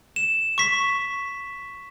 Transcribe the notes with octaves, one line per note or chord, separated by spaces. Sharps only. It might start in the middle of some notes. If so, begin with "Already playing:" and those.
E7
C#6 B6